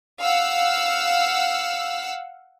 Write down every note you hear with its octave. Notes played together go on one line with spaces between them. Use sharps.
F5 F#5 E6